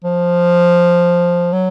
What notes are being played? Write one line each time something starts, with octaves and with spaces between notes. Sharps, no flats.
F3
F#3